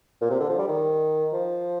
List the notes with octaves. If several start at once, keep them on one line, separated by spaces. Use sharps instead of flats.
A#2
C3
D3
F3
G3
D#3
F3